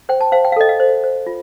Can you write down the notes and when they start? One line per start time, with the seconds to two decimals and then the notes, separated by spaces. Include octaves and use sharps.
0.09 C5 G5
0.21 A5
0.32 C5 F5
0.45 G5
0.52 F5
0.56 A4 D#5
0.69 F5
0.80 C5
1.04 C5
1.27 F4